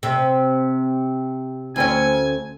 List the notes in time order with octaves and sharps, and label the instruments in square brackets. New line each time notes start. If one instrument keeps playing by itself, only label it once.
[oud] C3
[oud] D2 C4 C#4 [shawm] G#5